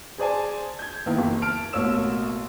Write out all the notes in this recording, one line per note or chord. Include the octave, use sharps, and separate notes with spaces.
G#4 C5 D5 G#5 A5
G6 G#6
D#3 A#3 B3 E4
F#1
A5 F6 D7
A1 B2 A#3 C#5 E6 E7